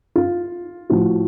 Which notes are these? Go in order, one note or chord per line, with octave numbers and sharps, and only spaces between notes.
F4
A2 F3 F#4